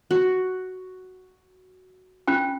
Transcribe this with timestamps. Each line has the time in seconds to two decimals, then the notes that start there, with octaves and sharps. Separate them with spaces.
0.11 F#4
2.28 C#4 F4 G5